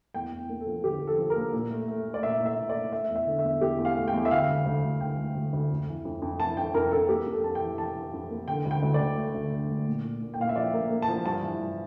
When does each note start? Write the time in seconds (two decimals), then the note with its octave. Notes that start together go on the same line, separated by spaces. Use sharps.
0.14 E2 G5
0.32 E2
0.49 A#3
0.60 A4
0.66 F3
0.84 D3 G4
1.01 F3
1.07 A4
1.18 F3
1.30 A#4
1.36 A#3
1.53 A#2
1.71 A3
1.88 A3
2.06 A3
2.14 D5
2.23 A#2 E5
2.40 A#2
2.46 E5
2.58 A#2
2.69 D5
2.75 A3
2.93 A3 E5
3.09 E2
3.16 E5
3.27 D3
3.39 E5
3.45 E2
3.61 E2 G4
3.79 E2
3.85 F5
3.97 A3
4.08 G5
4.14 E2
4.25 E5
4.31 D2 F5
4.48 D2
4.66 D2
4.83 D2
5.00 D2 G5
5.18 D2
5.35 D2
5.53 D2
5.70 F2
5.87 E3
6.05 F2
6.22 F2
6.40 E3 A5
6.57 F2 G5
6.74 F2 A#4
6.91 F2 A4
7.09 A#3 G4
7.26 F2
7.32 A4
7.44 F2 A5
7.55 G5
7.61 E3
7.78 E3 A5
7.96 E3
8.13 F2
8.30 A#3
8.48 D3 G5
8.65 D2
8.71 G5
8.83 D2
8.94 D5
9.00 D2
9.17 A3
9.35 D2
9.52 D3
9.70 D2
9.87 A#2
10.04 A#2
10.21 A#2
10.34 G5
10.39 A#2 F5
10.49 E5
10.56 F3 D5
10.74 A#3
10.90 A#3
11.02 A5
11.08 F3
11.26 G2 A5
11.43 E3
11.60 G2